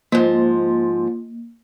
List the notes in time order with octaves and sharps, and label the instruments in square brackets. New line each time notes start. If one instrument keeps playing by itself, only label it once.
[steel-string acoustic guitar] G#2 F3 [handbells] A#3